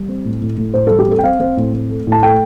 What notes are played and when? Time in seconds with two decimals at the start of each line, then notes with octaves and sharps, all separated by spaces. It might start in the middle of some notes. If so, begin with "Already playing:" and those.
Already playing: G3
0.08 C4
0.25 A2
0.41 A2
0.57 A2
0.74 A2 C5
0.87 G3 A4
0.99 G4
1.07 C4 A4
1.19 G5
1.23 C4 F5
1.40 C4
1.57 A2
1.73 C4
1.90 A3
2.07 A2 A5
2.23 A3 G5